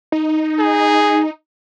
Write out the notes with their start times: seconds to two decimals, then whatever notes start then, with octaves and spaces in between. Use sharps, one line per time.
0.12 D#4
0.59 G#4